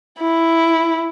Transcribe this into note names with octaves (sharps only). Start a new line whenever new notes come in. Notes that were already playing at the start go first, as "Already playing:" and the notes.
E4